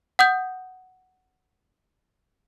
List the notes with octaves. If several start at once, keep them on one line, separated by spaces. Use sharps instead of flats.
F#5 D#6 G6